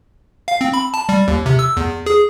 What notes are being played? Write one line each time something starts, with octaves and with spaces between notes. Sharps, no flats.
F5
C4
B5
A5
G3
D#2
C3
E6
E2
G#4